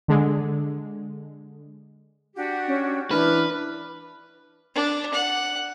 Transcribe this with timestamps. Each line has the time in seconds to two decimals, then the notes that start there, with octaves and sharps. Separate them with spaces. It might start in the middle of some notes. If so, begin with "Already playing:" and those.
0.08 D3 G#3
2.36 D4 F#4 G4
2.67 C#4
3.11 E3 D4 B4 F6
4.75 D4
5.14 F#5